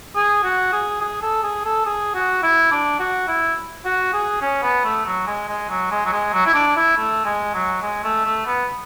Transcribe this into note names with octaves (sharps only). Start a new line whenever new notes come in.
G#4
F#4
G#4
G#4
A4
G#4
A4
G#4
F#4
E4
D4
F#4
E4
F#4
G#4
C#4
B3
A3
F#3
G#3
G#3
F#3
G#3
F#3
G#3
F#3
E4
D4
E4
A3
G#3
F#3
G#3
A3
A3
B3